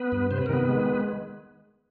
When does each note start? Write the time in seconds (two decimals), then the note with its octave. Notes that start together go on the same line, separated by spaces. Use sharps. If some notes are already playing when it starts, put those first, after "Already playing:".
Already playing: B3 B4
0.12 G2
0.31 C3 C5
0.38 B4
0.46 A#4
0.50 D#3 B3 B4
0.68 G#3